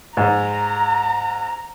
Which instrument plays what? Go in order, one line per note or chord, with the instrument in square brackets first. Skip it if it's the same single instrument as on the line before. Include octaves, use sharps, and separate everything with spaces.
[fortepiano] G#2 [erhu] A#5